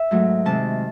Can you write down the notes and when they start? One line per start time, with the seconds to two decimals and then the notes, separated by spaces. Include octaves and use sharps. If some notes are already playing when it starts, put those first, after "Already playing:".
Already playing: E5
0.11 G#2 F#3 A3
0.45 C3 D#3 G#3 A5